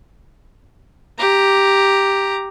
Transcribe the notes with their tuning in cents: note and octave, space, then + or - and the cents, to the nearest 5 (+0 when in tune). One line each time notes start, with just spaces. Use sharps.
G4 +0 A#5 +0